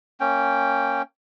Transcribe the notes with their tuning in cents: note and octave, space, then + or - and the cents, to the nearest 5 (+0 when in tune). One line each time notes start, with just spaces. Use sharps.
A#3 -15 C#4 +0 G5 +0